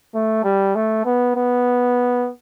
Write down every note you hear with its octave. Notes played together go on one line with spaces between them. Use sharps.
A3
G3
A3
B3
B3